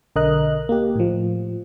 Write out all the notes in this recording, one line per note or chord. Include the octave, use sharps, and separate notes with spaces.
B1 D3 A#4 D#5 F#6
A#3 G4
A2 F3